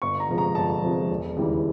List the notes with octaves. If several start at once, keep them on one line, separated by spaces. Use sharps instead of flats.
G1 C#6
A#5
F2 C3 F3 G#3
A#5
G1 A5
F2 C3 F3 G#3
E1
D#2 C#3 E3 G3